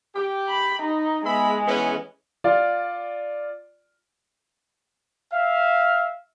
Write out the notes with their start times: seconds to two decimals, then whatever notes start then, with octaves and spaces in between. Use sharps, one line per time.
0.15 G4
0.49 B5
0.82 D#4
1.25 G#3 B3 E5 B5
1.67 E3 B3 C#4
2.44 F4 D5
5.32 E5 F5